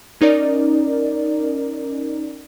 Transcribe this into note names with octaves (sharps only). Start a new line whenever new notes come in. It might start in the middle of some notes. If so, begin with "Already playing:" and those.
C#4 D#4 A#4 D5